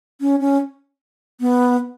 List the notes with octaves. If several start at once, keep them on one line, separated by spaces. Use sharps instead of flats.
C#4
C#4
B3